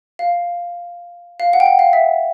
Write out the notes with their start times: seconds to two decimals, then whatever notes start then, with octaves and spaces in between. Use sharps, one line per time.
0.19 F5
1.40 F5
1.53 F#5
1.60 G5
1.66 F#5
1.79 F5
1.93 E5